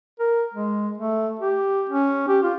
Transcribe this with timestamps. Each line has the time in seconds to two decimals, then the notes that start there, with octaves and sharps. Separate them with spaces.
0.20 A#4
0.54 G#3
0.98 A3
1.39 G4
1.89 C#4
2.28 G4
2.43 F4